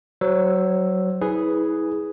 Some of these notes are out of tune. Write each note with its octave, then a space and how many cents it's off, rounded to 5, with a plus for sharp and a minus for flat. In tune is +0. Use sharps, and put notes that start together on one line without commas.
F#3 +20 C5 +0 E6 +0
E4 -40 G#4 +0 B4 +0